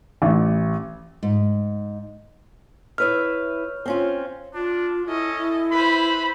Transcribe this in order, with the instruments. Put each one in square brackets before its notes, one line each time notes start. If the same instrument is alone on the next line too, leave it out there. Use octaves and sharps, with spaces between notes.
[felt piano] A1
[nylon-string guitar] G#2
[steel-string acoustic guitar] E4 B4 E5 [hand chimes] C#5 F6
[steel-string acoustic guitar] C4 C#4 F4
[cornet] D4 [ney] F4
[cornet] C#4 [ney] E4 [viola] A4 D#5
[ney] E4
[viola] B4 C5 [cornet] B5